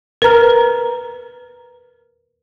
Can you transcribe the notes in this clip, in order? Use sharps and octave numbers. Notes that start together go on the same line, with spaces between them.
A#4 B4 A#5 F6